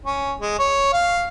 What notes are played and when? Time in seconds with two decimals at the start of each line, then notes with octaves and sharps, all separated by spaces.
0.06 C#4
0.41 G#3
0.59 C#5
0.93 F5